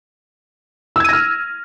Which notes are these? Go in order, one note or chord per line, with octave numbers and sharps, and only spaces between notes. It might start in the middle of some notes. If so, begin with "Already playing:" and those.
E6 F6 G#6 A#6 D#7